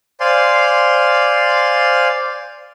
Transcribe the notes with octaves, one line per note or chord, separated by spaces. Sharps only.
C5 D5 F5 G#5 C6